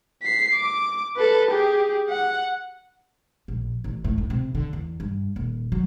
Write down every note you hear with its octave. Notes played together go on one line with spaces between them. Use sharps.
B6 C7
D6
A4 B4
G4 G#4
F#5
A#1
A1
A2
A2
C3
D3
E2
G2
D#1
F#3